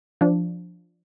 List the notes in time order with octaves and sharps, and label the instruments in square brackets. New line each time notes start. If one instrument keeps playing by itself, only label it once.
[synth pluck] F3 D4